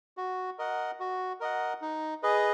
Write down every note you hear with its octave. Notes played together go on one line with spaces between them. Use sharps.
F#4
A#4 D#5 F#5
F#4
A#4 D#5 F#5
D#4
G#4 B4 D#5